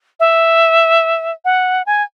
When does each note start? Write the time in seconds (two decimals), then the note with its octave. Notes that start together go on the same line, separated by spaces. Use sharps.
0.20 E5
1.45 F#5
1.86 G#5